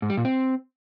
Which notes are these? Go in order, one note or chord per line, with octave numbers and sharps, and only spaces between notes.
G#2
G3
A#2
C4